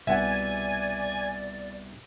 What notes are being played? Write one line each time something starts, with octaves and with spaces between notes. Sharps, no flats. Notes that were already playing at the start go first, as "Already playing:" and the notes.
C2 B2 D5 E5 F#5 G#5